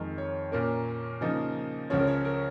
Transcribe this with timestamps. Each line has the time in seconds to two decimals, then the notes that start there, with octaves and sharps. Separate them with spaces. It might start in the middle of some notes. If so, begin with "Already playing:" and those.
Already playing: F2 D#3 G#3 A#4
0.18 C#5
0.52 A#2 A#3 C#4 A#4
1.21 C#3 F3 A#3 D#4
1.90 C#2 C#3 F3 C#4 C#5
1.99 A#4
2.07 C#5
2.25 A#4